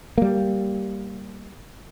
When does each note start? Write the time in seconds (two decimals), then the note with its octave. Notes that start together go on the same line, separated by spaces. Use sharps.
0.18 G3 A#3